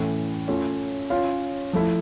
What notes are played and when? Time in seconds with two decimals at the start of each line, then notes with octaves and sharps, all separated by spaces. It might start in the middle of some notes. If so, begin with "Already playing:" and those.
Already playing: A2 E3 A3 C#4 E4
0.48 A3 C#4 F4 A4 C#5
1.10 C#4 F4 C#5 F5
1.73 F3 A3 E4